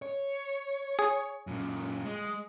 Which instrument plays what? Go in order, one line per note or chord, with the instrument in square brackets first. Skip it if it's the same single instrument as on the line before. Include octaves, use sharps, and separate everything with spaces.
[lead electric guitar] C#5
[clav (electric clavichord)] G#4
[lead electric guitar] F#2 A#2
G#3